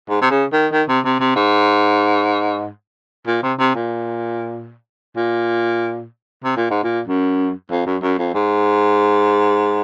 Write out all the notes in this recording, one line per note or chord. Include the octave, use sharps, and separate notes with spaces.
G#2
C3
C#3
D#3
D#3
C3
C3
C3
G#2
A#2
C3
C3
A#2
A#2
C3
A#2
G#2
A#2
F#2
F2
F#2
F#2
F2
G#2